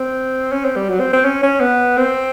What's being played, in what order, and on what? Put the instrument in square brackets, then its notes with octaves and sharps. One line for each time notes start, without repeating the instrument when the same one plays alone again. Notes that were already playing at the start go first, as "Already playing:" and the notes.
Already playing: [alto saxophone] C4
C#4
C4
G3
F#3
C4
C4
C#4
C#4
B3
C4